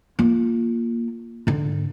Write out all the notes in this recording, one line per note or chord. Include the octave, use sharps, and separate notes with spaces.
A#3 F4
G#2 D3